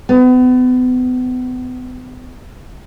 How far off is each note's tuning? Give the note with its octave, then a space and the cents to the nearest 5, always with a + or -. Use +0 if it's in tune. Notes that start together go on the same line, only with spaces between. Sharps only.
B3 +35